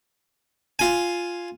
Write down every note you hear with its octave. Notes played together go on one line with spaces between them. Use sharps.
F4 G#5